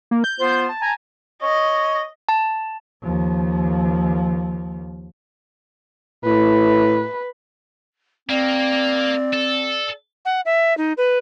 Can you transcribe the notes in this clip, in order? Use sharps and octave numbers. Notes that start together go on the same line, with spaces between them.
A#3
G6
B3 F4 C5
A5
G#5 A#5
C#5 D#5
A5
D#2 F3
A2 B4
A#3 C4 D5
A4
F#5
E5
D#4
B4